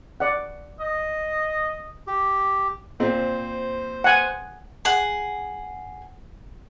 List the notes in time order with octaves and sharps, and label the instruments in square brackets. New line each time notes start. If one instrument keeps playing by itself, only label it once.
[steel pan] D5 F#5
[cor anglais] D#5
[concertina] G4
[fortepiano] A#2 C4 [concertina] C5
[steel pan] F#5 G#5
[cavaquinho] G#4 F#5